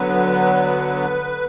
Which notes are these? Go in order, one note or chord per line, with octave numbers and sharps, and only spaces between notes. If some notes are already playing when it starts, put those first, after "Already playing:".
Already playing: D3 F#3 B3 B4